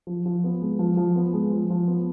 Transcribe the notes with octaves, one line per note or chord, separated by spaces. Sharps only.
F3
F3
B3
G#3
F3
F3
B3
G#3
F3
F3
B3